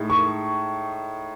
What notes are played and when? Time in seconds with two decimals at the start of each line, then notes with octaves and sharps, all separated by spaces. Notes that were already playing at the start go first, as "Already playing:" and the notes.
Already playing: A2 G#3 D#4
0.10 C#6